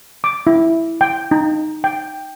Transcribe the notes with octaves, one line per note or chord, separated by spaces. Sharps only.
D6
E4
G5
D#4
G5